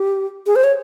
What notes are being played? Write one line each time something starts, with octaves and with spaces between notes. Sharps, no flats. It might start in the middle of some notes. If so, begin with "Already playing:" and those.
Already playing: G4
G#4
C5
C#5